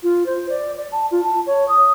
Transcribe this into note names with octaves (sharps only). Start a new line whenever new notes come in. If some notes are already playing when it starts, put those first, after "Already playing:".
F4
C5
D5
D5
A5
F4
A5
C#5
D#6